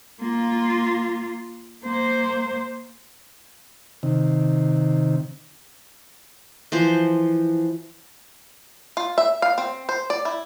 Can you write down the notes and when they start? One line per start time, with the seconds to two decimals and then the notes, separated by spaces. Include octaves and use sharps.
0.21 A#3 F4
1.84 A#3 C5
4.03 C3 D#3
6.72 E3 F3 C5
8.97 F4
9.18 E5
9.42 F5
9.58 C4
9.89 C5
10.10 D5
10.25 E4